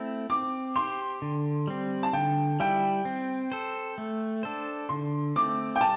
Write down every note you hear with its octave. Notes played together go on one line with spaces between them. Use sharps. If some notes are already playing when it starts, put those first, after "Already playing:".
Already playing: A3 C4 E4
C4 D6
G4 C5 C6
D3
G3 C4
A5
D3 G5
G3 E4 G5
C4
A4 C5
A3
D4 A4 C5
D3 C6
A3 C4 D6
G5
G3 A5